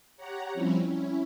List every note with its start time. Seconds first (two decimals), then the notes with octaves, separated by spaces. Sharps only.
0.17 G4 C#5 F#5 A#5
0.54 F3 G3 C4 C#4 E4
0.86 C#4 E4